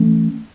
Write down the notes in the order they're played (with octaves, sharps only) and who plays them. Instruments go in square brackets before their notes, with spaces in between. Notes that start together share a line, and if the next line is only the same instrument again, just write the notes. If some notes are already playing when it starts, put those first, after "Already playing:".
Already playing: [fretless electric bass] E3 A3 C#4